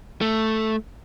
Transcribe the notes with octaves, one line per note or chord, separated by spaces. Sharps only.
A3